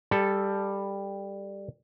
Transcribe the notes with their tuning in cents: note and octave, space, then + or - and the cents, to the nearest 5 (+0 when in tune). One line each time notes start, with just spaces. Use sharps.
G3 +10 A4 +0